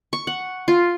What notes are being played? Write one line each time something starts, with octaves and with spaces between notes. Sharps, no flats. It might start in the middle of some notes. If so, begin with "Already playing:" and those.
C#6
F#5
F4